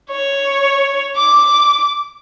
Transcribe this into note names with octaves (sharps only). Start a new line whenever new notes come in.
C#5
D6